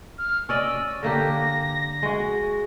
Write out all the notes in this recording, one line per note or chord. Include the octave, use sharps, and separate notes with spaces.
F6
C#4 D5 D#5 E6
D3 A#3 G4 A#6
G#3 F#4